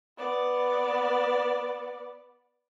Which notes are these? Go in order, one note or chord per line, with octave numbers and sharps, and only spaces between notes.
B3 D5